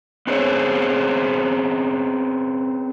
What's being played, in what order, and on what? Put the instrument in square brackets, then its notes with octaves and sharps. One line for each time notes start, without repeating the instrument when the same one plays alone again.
[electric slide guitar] B3 C4 G#4 C5 C#5